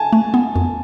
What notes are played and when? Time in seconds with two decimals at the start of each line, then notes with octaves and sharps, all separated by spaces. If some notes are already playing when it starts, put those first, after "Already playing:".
Already playing: G#5 A5
0.13 A3
0.34 B3
0.56 F2